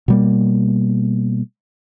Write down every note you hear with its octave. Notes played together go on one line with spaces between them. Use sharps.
B2 G3 A#3